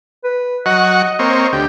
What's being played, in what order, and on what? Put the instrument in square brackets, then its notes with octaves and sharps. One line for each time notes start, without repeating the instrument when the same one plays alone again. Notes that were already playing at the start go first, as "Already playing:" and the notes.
[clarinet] B4
[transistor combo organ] F#3 F#5 C#6 [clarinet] D#5
[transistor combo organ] A#3 C4 C#5
D2 G4